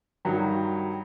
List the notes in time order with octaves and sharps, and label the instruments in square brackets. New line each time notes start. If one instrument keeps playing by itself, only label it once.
[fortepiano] G2 D#3 F#3